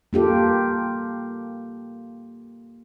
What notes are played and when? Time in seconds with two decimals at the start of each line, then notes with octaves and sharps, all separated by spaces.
0.13 A#3 F4 G4 A4